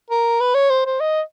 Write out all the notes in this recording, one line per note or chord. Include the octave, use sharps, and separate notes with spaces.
A#4
B4
C#5
C5
C5
D#5